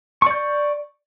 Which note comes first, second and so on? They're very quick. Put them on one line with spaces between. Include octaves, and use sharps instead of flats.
C#6 D5 G6